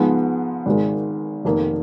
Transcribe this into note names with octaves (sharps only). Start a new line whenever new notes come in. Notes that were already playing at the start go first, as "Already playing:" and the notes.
Already playing: G#2 F3 G#3 B3
G#1 G#2 D#3 G#3
F1 F2 D#3 A#3